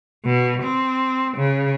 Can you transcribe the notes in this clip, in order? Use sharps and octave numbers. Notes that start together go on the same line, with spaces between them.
B2
C4
C#3